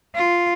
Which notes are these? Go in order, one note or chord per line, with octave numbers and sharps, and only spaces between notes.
F4